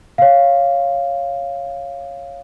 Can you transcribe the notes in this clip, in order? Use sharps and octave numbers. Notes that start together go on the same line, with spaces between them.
C#5 F5